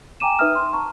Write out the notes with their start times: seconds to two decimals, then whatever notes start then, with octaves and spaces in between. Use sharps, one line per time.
0.20 G5 G#5 A#5 D6 D#7 E7
0.39 D#4 B4 E5 D#6 F6
0.55 C6
0.73 A5 A#5 C#6